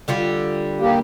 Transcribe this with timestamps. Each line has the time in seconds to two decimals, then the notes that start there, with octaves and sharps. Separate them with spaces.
0.08 D3 G3 F4
0.80 A#3 G4